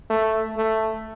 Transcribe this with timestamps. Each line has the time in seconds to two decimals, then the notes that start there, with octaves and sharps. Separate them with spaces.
0.10 A3
0.57 A3